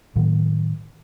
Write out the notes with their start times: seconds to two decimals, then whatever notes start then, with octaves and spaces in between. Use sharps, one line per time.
0.16 A2 D#3 F#3 A#3